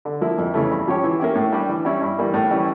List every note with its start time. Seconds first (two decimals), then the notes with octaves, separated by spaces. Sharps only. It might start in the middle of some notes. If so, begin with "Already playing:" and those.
0.05 D3
0.21 F3 A#3 E4
0.38 F2
0.54 C#3 E3 A3
0.71 G2
0.88 F3 C#4 G4 C#5
1.04 E3
1.19 A#3 C#4 E4 G4
1.35 A2
1.53 G3 D4 G4
1.69 E3
1.85 G3 C#4 E4
2.02 G2
2.18 E3 G3 A#3
2.34 A2
2.51 E3 G3 C#4